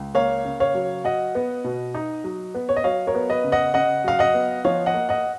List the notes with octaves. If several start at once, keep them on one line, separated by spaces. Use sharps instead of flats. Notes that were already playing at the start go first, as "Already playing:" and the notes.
Already playing: C#2
A#3 C#5 F5
C#3
C#5 F5
F#3
F#3 D#5 F#5
B3
B2
D#4
F#3
B3
C#5
D#5
F#3 C#5 F5
A#4 C#5
B3
B4 D#5
C#3
D#5 F#5
C#3 D#5 F#5
F#3 F5
D#5 F#5
B3
F3 C#5 F5
D#5 F#5
A#3
D#5 F#5